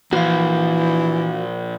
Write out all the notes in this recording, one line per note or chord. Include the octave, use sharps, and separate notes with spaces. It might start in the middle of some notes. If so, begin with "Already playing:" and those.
A#2 E3 F3 F#4 F5